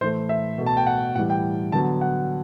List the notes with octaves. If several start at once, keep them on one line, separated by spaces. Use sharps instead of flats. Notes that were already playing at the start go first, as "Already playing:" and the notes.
A2 E3 A3 C5
E5
B2 A3
A5
G5
F#5
A2 E3 G3 F#5
G5
D3 F#3 B3 A5
F#5